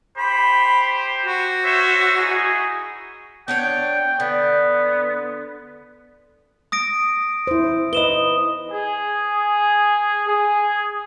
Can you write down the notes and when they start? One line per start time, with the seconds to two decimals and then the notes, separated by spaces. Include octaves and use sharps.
0.18 G4 C5 B5
1.26 F#4
1.65 C5 C#5 E5
2.18 D#4 E4 G#4
3.48 B3 D4 C#5 G5
4.20 D3 B3
6.72 D#6 A#6 D7
7.47 E4 C5
7.93 B4 D#5 D#6 E7 G7
8.71 G#4
10.28 G#4